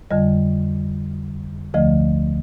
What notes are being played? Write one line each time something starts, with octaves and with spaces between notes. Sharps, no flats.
F2 D3 G3 D#5
D2 D3 F3 A3 D#5